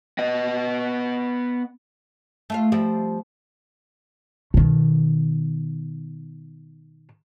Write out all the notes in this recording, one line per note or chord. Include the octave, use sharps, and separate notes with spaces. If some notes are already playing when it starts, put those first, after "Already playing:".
B3 D#5
A3 F4 F5
F3 G3 C4
B2 D#3